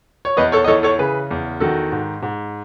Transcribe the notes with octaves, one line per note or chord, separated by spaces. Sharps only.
C#5
E2 B4 D#5
A4 C#5
D#5
E3 A4 C#5
A4 C#5
C#3 G#4 B4
E2
D#3 F#4 A4
G#2
G#2